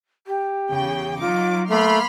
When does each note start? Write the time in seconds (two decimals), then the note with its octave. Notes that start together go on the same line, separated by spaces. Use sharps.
0.27 G4
0.70 E2 C#3 G5
1.20 F#3 D#4 F4 D6
1.70 A3 A#3 B5 C6 F6